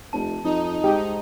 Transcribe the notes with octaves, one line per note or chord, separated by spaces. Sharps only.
F1 A5
F2 D#4
G#2 G4